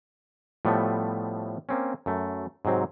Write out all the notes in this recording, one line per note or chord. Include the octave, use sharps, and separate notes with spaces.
A2 F3 G3 A3 B3
A#3 C4 C#4
F#2 A3
G#2 C3 F#3 C4